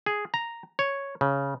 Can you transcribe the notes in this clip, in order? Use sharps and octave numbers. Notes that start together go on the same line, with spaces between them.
G#4
A#5
C#5
C#3